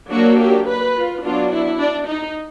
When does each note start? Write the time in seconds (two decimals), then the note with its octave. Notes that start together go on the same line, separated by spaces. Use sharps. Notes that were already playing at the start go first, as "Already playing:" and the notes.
0.11 F#3 A#3 D4 F#4
0.39 G4
0.67 B4
0.95 F4
1.23 F#3 B3 D4 F4
1.51 E4
1.79 D4
2.07 D#4